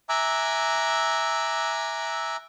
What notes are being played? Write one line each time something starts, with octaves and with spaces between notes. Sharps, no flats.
E5 G#5 A#5 D6 E6 F#6